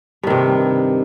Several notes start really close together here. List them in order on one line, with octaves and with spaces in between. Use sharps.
G2 D#3 C3